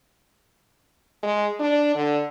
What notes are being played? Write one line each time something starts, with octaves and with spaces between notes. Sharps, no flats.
G#3
D4
D3